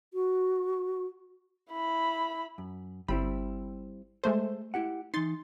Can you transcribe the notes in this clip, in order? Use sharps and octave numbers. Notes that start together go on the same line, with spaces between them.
F#4
E4 B5
F#2
G1 G3 C4 E4 B5
G#3 A3 A4 C5 E5
E4 G4 F#5
E3 D#4 C6 A6